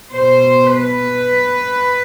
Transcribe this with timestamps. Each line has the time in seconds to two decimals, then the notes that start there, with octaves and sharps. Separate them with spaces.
0.13 B2 C5
0.77 B4